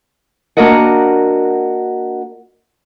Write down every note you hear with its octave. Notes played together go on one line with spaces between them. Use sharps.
A#3 D4 F#4 A#4 D#5 F#5